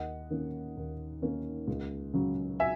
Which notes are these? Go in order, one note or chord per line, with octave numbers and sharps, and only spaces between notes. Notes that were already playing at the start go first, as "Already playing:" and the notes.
Already playing: D#2 D#5 F#5
D#3 A#3 C#4
D#2
D#3 A#3 C#4
C#2
C#3 F#3 C#4
E5 G#5